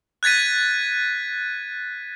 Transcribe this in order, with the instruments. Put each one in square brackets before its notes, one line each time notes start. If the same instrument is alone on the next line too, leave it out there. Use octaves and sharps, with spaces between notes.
[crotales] F#6 G#6 A6 B6 D#7